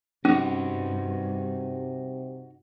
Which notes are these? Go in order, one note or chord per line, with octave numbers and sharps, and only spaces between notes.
G2 C3 C#4 D#4 F#4